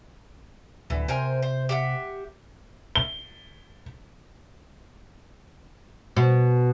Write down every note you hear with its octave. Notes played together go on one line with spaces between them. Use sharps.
D1 D3 E3
C3 A#4 C5 G#5
C5
G4 E5 F#5
G7
B2